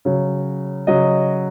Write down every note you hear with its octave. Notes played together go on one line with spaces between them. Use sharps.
C#3 F#3
C#3 F#3 D#5